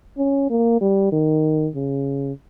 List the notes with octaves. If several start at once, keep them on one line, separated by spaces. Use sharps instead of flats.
C#4
A#3
G3
D#3
C#3